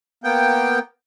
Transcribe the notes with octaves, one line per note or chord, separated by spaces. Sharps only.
A#3 B3 G5